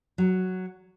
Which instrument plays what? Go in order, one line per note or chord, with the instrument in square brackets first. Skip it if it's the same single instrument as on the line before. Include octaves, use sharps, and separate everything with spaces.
[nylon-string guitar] F#3